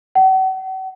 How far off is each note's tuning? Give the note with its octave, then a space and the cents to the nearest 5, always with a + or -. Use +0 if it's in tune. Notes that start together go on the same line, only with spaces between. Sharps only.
F#5 +45